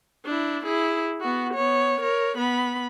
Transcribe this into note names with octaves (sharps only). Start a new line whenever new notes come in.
D4 E4
E4 G#4
B3 F#4
B3 C#5
A#4 C#5
B3 B5